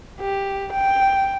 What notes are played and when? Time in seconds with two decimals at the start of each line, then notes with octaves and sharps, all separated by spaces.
0.21 G4
0.73 G5